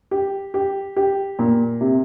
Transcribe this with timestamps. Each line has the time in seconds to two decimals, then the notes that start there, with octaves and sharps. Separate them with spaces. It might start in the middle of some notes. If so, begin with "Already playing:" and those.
0.11 G4
0.54 G4
0.96 G4
1.39 A#2
1.81 C3